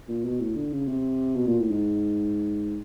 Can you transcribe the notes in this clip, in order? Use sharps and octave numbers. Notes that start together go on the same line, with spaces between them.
A#2
B2
A2
D3
C#3
C3
B2
A#2
A2
G#2